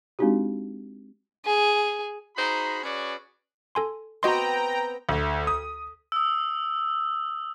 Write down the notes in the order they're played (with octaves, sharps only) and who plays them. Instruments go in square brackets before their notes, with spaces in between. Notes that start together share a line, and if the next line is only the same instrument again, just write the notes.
[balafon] G#3 C4 D4 D#4 F#4 G4
[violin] G#4
[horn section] D#4 F#4 G#4 C5 A#5 B5
C#4 F#4 G#4 B4 C#5 D5
[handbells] A4 G#5 C6
[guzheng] B3 C4 [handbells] F#4 D#5 C6 [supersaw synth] G5 A#5
[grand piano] D2
D#6
[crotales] D#6 E6